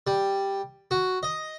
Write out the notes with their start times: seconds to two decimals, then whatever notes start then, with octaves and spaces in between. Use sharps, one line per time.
0.07 G3
0.91 F#4
1.23 D#5